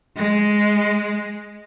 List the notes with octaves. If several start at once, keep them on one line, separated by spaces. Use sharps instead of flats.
G#3